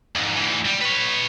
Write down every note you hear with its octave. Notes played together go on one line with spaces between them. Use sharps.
F2 G#2
D2 E3
G3
B4 C#5